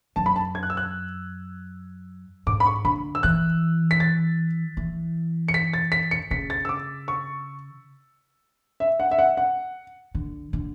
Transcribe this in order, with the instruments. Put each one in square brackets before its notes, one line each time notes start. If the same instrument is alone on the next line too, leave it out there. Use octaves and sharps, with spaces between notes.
[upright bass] F#2 [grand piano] A5
[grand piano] B5
A5
G#6
F#6
E6
F#6
[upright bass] G#2 [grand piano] D6
[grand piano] B5
C#6
[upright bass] D3 [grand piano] B5
[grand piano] E6
[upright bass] E3 [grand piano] F#6
[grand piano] B6
A6
[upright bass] E3
[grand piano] C#7
B6
A6
B6
C#7
[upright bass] C#3 [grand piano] B6
[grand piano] A6
E6
D6
C#6
E5
F#5
E5
F#5
F#5
[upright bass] D3
D3